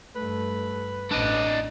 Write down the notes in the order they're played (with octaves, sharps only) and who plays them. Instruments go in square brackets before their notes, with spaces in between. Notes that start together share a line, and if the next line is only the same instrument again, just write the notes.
[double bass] G2 A3 [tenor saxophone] B4
[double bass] A1 [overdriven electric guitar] D4 D#5